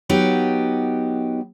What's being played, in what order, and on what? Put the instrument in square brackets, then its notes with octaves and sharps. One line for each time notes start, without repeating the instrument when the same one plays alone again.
[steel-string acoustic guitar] F#3 B3 D#4 G4